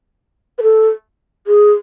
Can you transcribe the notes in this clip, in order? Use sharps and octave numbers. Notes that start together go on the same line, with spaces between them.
B4
A4
G#4